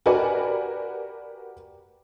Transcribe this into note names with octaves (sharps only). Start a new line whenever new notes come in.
F#4 G4 A#4 B4 D5 G#5